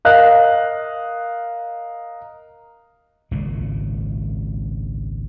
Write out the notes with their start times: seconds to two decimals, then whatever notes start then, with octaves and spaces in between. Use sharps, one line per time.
0.05 A#4 D#5 F5 F#6
3.31 G#1 C#2 A#2